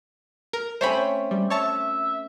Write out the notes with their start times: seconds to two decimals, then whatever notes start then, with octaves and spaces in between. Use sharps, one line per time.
0.53 A#4
0.81 A3 C4 C#4 C5 C#5 B5
1.31 G3
1.50 C#5 E5 A5 C#6